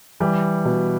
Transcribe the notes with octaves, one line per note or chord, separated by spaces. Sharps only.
E3 G3
B2